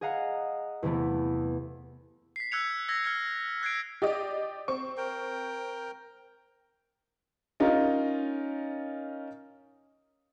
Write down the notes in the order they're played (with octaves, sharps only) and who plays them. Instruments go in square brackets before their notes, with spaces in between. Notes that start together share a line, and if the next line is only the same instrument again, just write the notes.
[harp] G#4 D#5 F5 F#5 A#5
E2 C3 E3 A3 B3
[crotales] B6 C7
E6 F#6 G#6 C#7 F7
E6 G#6 A#6
F6 G#6 C#7
F6 F#6 G#6 C7 D7
[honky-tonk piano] G4 D5 D#5
C4 C#6
[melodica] A#4 G5
[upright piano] C#4 D#4 F4 A#4